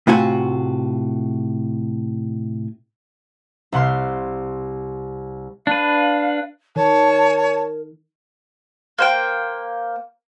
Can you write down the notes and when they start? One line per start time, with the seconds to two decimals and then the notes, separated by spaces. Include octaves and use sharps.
0.07 A2 C3 F4 F#4 G#5
3.72 C2 C3 F#5 C6 F6
5.67 D4 B4 F5
6.76 D#3 A#4 C#5 A5
8.99 A#3 C5 G5